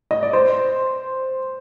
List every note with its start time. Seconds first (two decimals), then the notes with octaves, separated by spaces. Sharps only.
0.11 D#5
0.23 D5
0.33 C5